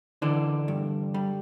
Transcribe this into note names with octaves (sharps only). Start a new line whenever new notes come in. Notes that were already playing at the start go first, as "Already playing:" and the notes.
D3 E3 D4
G2
G3